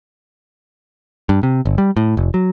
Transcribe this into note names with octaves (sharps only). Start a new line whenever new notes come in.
G2
C3
G1
G3
A2
F1
F#3